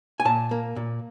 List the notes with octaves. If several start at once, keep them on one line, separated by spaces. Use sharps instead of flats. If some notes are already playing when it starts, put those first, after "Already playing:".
G#5
A#2 A5
A#3
A#2